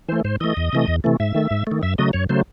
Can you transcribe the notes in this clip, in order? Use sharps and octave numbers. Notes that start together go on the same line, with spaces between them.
E3 A3 C5
G#2 C5
E3 A3 D#5
E2
C3 E3 A3
E2
C3 E3 A3
G#2 E5
D#3 A3
G#2
D#3 A3
F#2 E5
C#3 F#3 A3 D#5
F#2 C#5
C#3 F#3 A3 C5